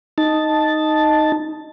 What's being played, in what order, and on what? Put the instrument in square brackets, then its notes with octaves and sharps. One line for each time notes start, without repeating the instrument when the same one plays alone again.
[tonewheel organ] D#4 A5